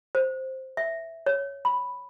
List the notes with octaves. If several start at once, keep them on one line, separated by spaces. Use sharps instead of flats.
C5
E5
C#5
B5